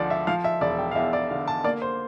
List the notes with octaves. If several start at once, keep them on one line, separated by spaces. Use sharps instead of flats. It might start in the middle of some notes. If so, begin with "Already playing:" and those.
Already playing: D2 D3 F3 D5
E5
F3 F5
E5
E1 D5
G5
F5
E2 E5
D5
D3 F5
A5
A#3 D5
C5